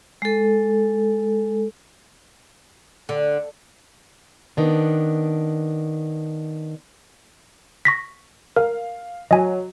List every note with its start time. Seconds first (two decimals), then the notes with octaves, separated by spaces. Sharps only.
0.22 G#3 A4
3.09 D3
4.57 D#3 B3 D4
7.85 C#6 A#6 B6
8.56 A#4 F5
9.31 F#3 D#5 G#5